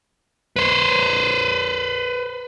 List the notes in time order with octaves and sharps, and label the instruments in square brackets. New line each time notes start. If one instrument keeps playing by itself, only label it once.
[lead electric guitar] B4 C5